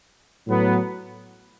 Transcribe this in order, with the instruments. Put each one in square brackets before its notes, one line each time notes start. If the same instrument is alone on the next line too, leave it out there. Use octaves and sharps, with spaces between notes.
[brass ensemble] A2 F#3 B3